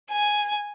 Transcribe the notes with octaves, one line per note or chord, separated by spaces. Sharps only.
G#5